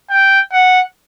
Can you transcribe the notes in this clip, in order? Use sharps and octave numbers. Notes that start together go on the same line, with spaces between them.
G5
F#5